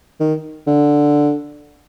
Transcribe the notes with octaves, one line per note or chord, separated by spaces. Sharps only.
D#3
D3